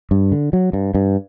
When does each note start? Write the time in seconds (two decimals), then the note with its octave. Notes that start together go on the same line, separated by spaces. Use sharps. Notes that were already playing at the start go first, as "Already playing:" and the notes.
0.11 G2
0.32 D3
0.53 F#3
0.73 G2
0.95 G2